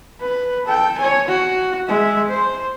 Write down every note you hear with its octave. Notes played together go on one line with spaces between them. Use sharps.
B4
A4 G5
C#5 G#5
F#4
G#3 E5
C5